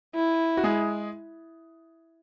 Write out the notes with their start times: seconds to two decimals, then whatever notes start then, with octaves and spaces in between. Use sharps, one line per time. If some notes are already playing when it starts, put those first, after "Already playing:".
0.15 E4
0.57 F#4
0.64 G#3 G#4